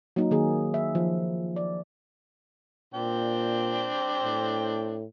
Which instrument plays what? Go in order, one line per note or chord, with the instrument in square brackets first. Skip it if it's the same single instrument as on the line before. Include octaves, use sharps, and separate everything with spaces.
[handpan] F#3 A#3 D#4
D#3 A#3 G#4
E5
F3
D5
[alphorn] A#2 [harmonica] C4 D4 G5
[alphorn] A2